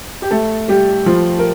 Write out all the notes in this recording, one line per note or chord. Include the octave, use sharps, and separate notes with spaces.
G4
A3 A4
G3 G4
F3 F4
A#4